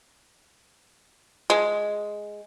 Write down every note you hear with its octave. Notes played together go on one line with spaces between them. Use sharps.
G#3